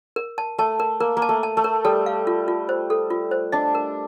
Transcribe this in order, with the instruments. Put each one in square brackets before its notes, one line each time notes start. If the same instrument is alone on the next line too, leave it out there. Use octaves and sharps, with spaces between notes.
[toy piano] A#4
A5
[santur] A3 [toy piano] A5
[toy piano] A#4
[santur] A#3 [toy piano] A#4
[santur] A#3
[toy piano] A5
[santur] A3
[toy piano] A5
[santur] A3
[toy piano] A#4
[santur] G3 [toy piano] A4
[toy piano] F5
F4
F4
C5
A4
F4
C5
[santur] D4 [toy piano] D#5
[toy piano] A#4